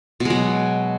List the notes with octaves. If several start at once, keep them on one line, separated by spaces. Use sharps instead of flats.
B2 F#3 G#3